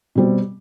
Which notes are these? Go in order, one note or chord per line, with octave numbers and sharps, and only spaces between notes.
B2 G3 C4